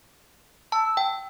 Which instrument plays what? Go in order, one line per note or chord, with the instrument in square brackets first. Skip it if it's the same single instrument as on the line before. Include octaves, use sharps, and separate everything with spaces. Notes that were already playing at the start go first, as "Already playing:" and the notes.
[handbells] A5 [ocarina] E6
[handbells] G5